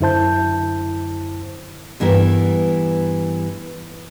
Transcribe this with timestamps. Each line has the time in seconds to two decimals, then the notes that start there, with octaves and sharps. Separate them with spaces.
0.01 F#2 D3 E4 C5 A5 G6
2.00 G2 E3 B3 A#4